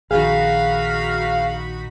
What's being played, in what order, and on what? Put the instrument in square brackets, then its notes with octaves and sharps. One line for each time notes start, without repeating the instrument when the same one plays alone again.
[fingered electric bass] A#1 D#3 [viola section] D#4 F#4 B5 [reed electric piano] G#4 [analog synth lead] F5